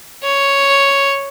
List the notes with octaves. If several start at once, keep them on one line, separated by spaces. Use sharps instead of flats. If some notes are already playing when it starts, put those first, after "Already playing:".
C#5